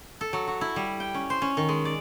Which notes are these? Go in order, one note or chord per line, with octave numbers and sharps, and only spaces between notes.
A4
F#3
F#4
E4
G3
G5
C#4
C5
C#4
D#3
G#3
D5